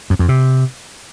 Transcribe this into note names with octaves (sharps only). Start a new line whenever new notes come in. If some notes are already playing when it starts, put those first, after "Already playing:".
F#2
F2
C3